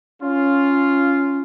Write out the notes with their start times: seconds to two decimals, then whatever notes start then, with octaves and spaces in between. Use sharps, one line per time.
0.23 C#4 F4